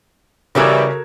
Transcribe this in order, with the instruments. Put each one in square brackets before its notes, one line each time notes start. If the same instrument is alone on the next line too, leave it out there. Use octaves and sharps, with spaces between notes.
[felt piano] C#3 G#6 [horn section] E3 G3 [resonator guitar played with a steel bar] F#4 A4 A#4